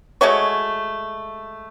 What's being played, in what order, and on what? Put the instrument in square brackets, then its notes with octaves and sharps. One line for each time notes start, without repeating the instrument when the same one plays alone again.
[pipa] G#3 A3 F#4 C#5